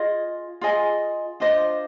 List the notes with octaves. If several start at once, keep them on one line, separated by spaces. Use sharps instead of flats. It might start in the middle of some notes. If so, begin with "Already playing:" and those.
Already playing: F4 G#4 D#5
F4 G#4 D#5 G#5
D4 F4 C5 D#5